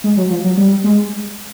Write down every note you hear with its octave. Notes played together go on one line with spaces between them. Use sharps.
G#3
F#3
F3
F#3
G3
G#3